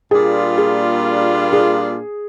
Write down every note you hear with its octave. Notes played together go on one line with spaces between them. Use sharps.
A#2 G3 A#3 D4 F4 G#4
G#4
G#4